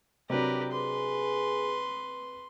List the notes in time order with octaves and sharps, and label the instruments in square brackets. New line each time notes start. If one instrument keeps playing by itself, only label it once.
[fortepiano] C3 F#3 D4 [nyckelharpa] G4 B4 [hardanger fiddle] A#4
[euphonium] G#4 [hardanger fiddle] B4 [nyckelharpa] C6